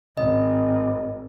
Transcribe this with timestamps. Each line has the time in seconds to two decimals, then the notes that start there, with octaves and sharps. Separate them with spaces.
0.17 G#1 D#5